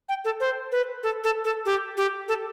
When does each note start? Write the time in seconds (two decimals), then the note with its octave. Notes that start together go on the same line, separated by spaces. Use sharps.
0.09 G5
0.25 A4
0.40 C5
0.72 B4
1.03 A4
1.24 A4
1.44 A4
1.66 G4
1.97 G4
2.28 A4